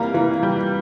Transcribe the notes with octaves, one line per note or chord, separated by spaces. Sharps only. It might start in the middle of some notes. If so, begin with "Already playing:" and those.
Already playing: E3 G3 A#3 F5 A#5
E3
G3